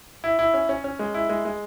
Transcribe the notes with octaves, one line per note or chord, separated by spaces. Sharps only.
E4
E4
C#4
C#4
C#4
G#3
E4
G#3
G#3